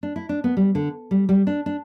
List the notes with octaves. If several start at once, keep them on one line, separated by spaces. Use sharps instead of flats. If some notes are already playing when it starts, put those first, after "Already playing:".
D4
E4
D4
B3
G3
D3
G3
G3
D4
D4